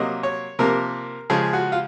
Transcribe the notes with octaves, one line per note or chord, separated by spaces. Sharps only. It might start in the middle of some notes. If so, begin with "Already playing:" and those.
Already playing: C3 F#3 A#3 D#5
C#5
C3 F3 A#3 A#4
C#3 F3 G#3 G#4
F#4
F4